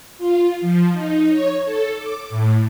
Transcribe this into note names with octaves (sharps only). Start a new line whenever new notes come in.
F4
F3
D#4
C#5
A4
D6
A2